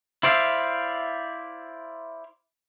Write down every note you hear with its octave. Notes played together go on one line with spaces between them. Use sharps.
E4 C5 D5 E5 F5